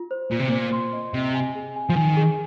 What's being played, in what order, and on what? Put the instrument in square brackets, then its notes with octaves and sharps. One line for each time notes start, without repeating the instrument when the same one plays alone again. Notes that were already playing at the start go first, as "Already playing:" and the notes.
Already playing: [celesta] F4
C5
[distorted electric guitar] A#2 [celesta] F4
[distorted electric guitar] C3
[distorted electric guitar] A#2 [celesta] C5
[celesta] C6
D#5
[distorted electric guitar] C3 [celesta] D#5
[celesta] G#5
G#4
G#5
[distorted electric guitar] F3
[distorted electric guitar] D#3 [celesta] G#5
[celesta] G#4